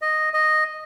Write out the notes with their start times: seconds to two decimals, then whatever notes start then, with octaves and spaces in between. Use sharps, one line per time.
0.02 D#5
0.34 D#5